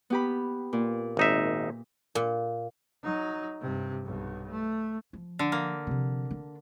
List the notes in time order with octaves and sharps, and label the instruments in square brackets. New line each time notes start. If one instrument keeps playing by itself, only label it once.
[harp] B3 G4 B5
A#2
[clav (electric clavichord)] G#1 D#4 E5
[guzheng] A#2
[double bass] F#3 D#4
G2 C3
B1 G2
A3
[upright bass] F3
[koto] D3
A#3
[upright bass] C3 F3
D4